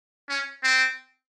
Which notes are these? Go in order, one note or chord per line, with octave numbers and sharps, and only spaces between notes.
C#4
C4